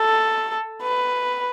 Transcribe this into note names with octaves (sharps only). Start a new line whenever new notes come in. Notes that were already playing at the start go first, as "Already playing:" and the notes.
Already playing: A4
B4